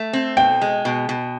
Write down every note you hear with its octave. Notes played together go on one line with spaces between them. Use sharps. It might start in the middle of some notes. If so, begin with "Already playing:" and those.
Already playing: A3
C4
B2 G5
G#3
B2
B2